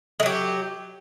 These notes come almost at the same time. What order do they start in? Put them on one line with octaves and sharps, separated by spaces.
G#3 F#3 G4